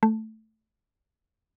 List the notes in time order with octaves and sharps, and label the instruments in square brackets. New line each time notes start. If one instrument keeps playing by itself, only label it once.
[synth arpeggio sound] A3